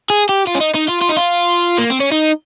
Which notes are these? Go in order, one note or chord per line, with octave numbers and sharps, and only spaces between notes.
G#4
G4
F4
C#4
D#4
D#4
F4
F4
D#4
F4
A#3
C4
C#4
D#4